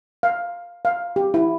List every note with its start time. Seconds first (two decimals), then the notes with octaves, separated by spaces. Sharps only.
0.23 F5
0.85 F5
1.16 G4
1.34 E4